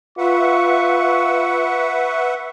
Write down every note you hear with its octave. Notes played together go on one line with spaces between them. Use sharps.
F4 B4 E5 F#5 C#6